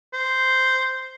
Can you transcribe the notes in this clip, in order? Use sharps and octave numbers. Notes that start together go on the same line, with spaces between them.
C5